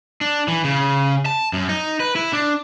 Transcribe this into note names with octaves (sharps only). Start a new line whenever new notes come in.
D4
E3
C#3
A5
F#2
D#4
B4
E4
D4